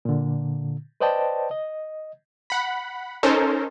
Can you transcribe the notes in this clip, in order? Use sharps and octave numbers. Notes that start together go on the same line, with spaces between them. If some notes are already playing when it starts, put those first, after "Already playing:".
A#2 D3
B4 C5 D5 D#5 G5 A5
D#5
F#5 B5
C#4 D#4 A4 A#4 C5